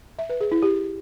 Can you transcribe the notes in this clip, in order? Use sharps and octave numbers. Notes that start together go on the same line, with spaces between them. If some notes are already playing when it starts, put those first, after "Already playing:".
E5
B4
G#4
E4
G4